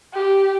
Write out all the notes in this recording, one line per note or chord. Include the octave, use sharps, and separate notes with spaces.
G4